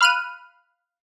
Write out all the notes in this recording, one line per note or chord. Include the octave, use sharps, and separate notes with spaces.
F5 B5 F6 F#6 D#7